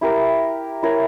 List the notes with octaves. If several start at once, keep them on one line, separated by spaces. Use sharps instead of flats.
E4 G4 A#4
E4 A#4 C#5